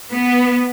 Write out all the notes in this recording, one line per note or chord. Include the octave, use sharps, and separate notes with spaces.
B3